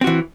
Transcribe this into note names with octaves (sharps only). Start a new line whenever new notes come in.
E3 C4 F#4